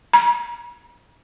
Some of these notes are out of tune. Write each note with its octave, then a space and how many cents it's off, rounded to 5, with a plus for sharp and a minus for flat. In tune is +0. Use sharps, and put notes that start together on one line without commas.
A#5 +35